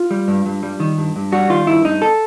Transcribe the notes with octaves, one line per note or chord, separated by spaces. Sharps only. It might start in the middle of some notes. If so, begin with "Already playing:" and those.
Already playing: F4
G3
G2
G2
G3
D#3
G2
G2
G3 F#4
D#3 F4
G2 E4
G2 D#4
A4